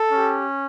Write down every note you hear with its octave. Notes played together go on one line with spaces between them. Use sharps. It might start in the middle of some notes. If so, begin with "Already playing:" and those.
Already playing: A4
C#4 G4